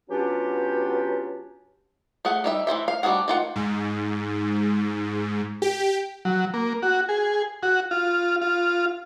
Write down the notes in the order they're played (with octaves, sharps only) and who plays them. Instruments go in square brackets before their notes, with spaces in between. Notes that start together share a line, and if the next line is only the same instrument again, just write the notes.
[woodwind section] F#3 B3 C#4 D4 F4 G4
[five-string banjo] A3 G#4 F#5
G3 D#4 E5
E3 C#4 C5 E5
F5
G3 D4 F#4 G#4 F#5
D#3 F4 F#5
[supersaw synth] G#2
G4
[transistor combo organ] F#3
A#3
F#4
G#4
F#4
F4
F4